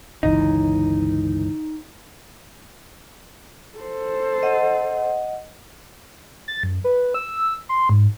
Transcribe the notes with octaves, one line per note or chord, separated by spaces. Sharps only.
G1 C#2 E3 D#4
A4 C5
D#5 F#5
A6
F#2
B4
E6
C6
G#2